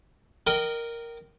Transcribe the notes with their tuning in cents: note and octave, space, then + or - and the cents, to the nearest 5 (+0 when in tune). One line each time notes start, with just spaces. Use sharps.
A#4 +0 D#5 -25 G5 -25